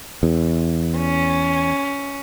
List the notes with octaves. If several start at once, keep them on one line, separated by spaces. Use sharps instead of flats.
E2
C#4